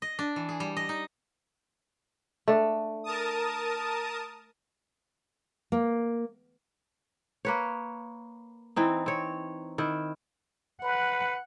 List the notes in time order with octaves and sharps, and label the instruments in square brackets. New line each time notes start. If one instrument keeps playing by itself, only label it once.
[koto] D#5
D4
E3
G#4
G3
D#5
D#4
[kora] A3 D4
[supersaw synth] A#4 A5 D#6
[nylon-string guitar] A#3
[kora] A#3 B4 C#5
E3 C4 D#4
C4 C#5
D#3 E4
[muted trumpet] B4 [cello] F#5